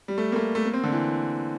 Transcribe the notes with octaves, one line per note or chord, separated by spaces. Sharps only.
G3
A3
A#3
A3
A3
A#3
C4
D3
E3